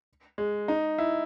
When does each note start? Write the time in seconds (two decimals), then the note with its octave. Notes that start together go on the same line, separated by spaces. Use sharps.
0.38 G#3
0.68 D#4
0.98 E4